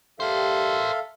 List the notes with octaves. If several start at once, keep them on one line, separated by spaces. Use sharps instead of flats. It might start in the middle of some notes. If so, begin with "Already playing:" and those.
G2 G4 A4 A#4 C5 E5 F5